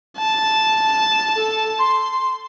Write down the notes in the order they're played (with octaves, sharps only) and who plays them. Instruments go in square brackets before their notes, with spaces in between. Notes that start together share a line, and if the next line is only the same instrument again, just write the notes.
[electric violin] A5
[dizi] A4
C6